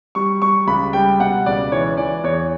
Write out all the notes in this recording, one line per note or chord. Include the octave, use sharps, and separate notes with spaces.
G3 C#6
G3 C#6
C#2 B5
G3 G5
B2 F#5
C#2 D5
E3 C#5
E3 D5
E2 C#5